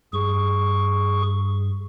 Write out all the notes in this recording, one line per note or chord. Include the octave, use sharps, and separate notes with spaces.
G2 G#4 C#6